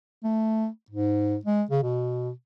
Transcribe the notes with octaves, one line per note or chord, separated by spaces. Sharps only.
A3
G#2
G#3
C#3
B2